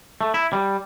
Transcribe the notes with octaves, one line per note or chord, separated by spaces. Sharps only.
A3
E4
G3